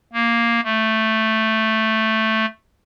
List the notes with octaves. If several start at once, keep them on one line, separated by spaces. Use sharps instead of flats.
A#3
A3